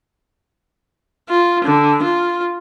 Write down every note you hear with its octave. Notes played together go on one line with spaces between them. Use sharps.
F4
D3
F4